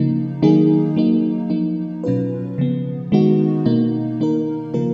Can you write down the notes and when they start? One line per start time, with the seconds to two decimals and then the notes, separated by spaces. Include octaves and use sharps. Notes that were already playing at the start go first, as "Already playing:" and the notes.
Already playing: C#3 F3 A#3 D#4
0.42 D#3 F#3 A#3 D#4 G#4
0.96 F#3 A#3 D#4
1.50 F3 A#3 D#4
2.04 B2 F#3 C#4 F4 B4
2.58 C#3 F3 B3
3.12 D#3 G#3 B3 D#4 F#4
3.66 B2 A#3 D#4
4.20 D#3 A#3 D#4 A#4
4.74 C#3 F3 A#3 F4 A#4